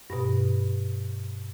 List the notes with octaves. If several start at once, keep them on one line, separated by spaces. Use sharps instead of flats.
G2 B2